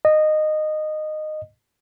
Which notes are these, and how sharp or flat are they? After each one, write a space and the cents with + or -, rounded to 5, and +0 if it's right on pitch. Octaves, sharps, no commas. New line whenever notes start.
D#5 -15